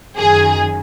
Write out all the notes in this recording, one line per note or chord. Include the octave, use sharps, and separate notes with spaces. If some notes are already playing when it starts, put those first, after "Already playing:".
F#2 D#3 G#4